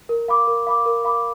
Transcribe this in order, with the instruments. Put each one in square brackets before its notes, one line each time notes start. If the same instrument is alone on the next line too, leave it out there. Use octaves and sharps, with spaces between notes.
[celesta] A#4
F5 B5 D6
A#4
F5 B5 D6
A#4
F5 B5 D6